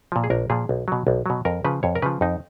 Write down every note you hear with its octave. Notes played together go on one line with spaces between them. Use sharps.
A#2 F3
G#4
A#1 A#4
A#2 F3 G#4
B1
B2 F#3
B1
B2 F#3
F2 A#4
C#3 F3 B4
F2 C#5
A#4
C#3 F3 B4
F2 D#4